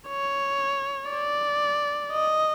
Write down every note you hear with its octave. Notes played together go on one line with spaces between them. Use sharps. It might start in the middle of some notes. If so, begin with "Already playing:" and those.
C#5
D5
D#5